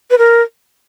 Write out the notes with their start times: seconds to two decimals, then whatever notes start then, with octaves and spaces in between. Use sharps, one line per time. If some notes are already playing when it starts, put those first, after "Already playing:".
0.11 B4
0.18 A#4